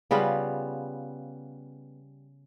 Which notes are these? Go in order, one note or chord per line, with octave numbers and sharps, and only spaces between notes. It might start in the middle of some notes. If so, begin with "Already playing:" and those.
C#3 G3 B3 F4